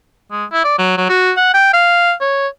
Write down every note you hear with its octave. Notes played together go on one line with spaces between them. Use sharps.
G#3
E4
D5
F#3
F#3
F#4
F#5
G5
F5
C#5